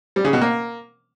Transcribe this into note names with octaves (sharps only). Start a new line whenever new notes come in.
G3
C#3
B2
A#3